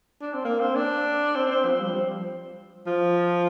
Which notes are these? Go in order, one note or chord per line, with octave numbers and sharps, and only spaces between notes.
D4
C4
A#3
C4
D4
C4
C4
F3
G3
F3
F3